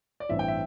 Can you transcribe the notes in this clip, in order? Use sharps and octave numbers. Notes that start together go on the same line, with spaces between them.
D5
A1 G2 E3 C4 E5
G5
E5